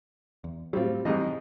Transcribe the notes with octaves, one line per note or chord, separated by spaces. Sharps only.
E2
A2 F#3 G3 C4 F4
F2 G#2 E3 F3 G3 D#5